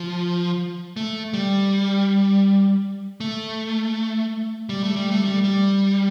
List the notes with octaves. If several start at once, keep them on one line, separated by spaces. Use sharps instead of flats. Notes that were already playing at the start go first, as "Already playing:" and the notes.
Already playing: F3
A3
G3
A3
G3
A3
G3
A3
G3
G3